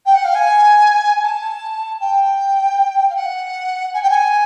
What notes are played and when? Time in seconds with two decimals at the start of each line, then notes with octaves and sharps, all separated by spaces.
0.06 G5
0.15 F#5
0.25 F5
0.35 G#5
1.23 A5
2.00 G5
3.10 F5
3.16 F#5
3.94 G#5
4.03 G5
4.10 G#5